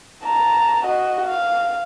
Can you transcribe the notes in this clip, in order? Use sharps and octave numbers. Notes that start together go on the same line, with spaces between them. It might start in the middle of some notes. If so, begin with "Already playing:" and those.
A5 A#5
F#4 D#5
F5